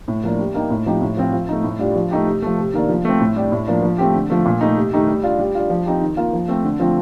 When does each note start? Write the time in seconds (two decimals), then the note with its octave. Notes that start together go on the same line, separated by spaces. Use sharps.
0.08 A2
0.24 F3 A#3 D4
0.39 G3
0.55 A#3 D#4 G4
0.70 A2
0.86 F3 C4 D#4 G4
1.02 A2
1.17 F3 C4 F4
1.33 F3
1.49 A3 D#4
1.64 A2
1.79 G3 D4 F4
1.96 F3
2.11 A3 D#4 G4
2.27 C3
2.42 F3 A3
2.58 C3
2.74 D#3 A#3 D4
2.89 F3
3.05 A3 C4
3.20 A2
3.36 G3 D4 G4
3.52 A2
3.67 F3 A#3 D4
3.83 F3
3.98 A3 C4 G4
4.14 D3
4.30 F3 A3
4.45 A#2
4.61 A3 D#4
4.76 C3
4.92 D#3 A3 D#4 G4
5.08 G3
5.23 D4 F4
5.39 G3
5.55 D4 F4
5.70 F3
5.86 C4 D#4 G4
6.01 D#3
6.17 A#3 F4
6.33 F3
6.48 A3 C4
6.64 D3
6.80 F3 A3 C4 F4